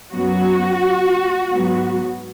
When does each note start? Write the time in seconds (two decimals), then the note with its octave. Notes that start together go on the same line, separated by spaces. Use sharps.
0.13 F#2 F#3 B3 F#4
1.50 G#2 F#3 B3